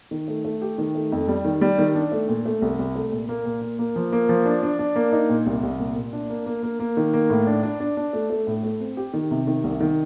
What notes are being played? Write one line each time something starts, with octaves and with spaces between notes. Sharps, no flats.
D#3
A3
A3
G4
D#3
A3
F2
G3
D#3
G3
D#3
D4
A3
A#2
A3
C2
C2
A3
A#2
A#3
A#2
A#3
A#3
F3
A#3
F3
D4
D4
D4
A#3
D#4
A#2
C2
C2
A#2
A#2
D4
A#3
A#3
A#3
A#3
D#3
A#3
A2
D4
D4
D4
D4
A3
A3
A2
A3
C4
G4
D#3
C3
D#3
C2
D#3